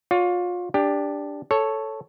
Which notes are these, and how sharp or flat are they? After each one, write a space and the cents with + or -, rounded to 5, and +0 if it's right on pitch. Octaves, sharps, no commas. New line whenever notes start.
F4 +30 C#5 +40
D4 -5 G4 +15
A4 +0 C#5 +0